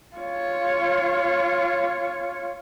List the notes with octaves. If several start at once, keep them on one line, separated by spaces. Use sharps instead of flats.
F4 C#5